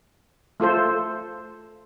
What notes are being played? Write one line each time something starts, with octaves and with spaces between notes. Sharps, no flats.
A3 F4 A4 C5